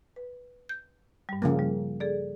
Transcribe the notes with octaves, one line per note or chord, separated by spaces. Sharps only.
B4
G6
G2 G3
C#3 F3 A#3
G3
G#4 A4 D5